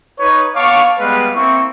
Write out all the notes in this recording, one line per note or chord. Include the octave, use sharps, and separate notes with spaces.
D#4 B4 C#5
B3 C#5 F5 A5 C#6 D6
G3 G#3 B3 B4 F5
A#3 C4 E4 C#6